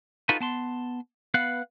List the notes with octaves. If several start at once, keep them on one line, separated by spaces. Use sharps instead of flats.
D#4 F4 F#4 A4 B4
B3 A5 C6
B3 B4 F5 F#5